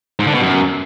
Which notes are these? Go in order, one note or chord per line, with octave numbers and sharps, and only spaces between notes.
G#2
D3
B2
F#2